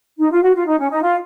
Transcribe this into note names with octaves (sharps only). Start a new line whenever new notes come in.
D#4
F4
F#4
F4
D#4
C#4
D#4
F4